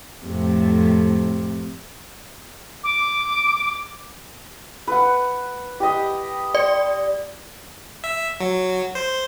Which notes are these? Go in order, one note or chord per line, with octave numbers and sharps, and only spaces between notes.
F2 A2 C3
D6
B4 F#5
G4 D#5
D5
E5
F#3
C5